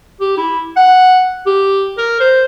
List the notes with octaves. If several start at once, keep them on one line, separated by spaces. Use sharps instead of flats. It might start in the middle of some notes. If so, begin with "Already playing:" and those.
G4
E4
F#5
G4
A#4
C5